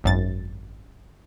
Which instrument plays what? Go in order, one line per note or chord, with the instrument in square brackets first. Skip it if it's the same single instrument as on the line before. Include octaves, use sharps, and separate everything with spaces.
[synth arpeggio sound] G#1 F#2 A6